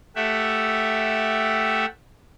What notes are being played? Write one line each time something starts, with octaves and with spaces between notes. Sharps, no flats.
A3 G4 E5 F#5